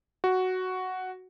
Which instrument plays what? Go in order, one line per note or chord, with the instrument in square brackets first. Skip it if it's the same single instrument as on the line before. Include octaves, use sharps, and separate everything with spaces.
[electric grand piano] F#4